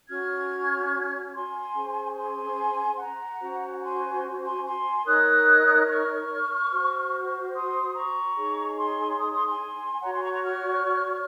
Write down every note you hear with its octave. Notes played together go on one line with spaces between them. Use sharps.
C#4 F#4 C#5 F6 G#6
G#5 C6
C#4 G#4 C5
G#5 C6
F#5 A#5
C#4 F#4 C5
G#5 C6
G#5 C6
G#5 C6
D#4 A#4 C#5 D#6 F#6
C#6 F6
F#4 C5
C6 D#6
A#5 C#6
D#4 G#4 C#5
G#5 C6
C6 D#6
C6 D#6
G#5 C6
F#4 C#5 F#5 A#5
G#5 C6
A#5 C#6
A#5 C#6
C#6 F6